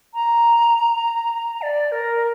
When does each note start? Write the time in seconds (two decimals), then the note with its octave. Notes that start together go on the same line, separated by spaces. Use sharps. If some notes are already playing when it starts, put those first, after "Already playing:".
0.14 A#5
1.62 D5
1.92 A#4